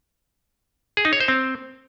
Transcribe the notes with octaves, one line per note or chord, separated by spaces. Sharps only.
G#4
D#4
C#5
C5
C4